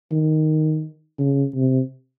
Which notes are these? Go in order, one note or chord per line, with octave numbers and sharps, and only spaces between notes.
D#3
C#3
C3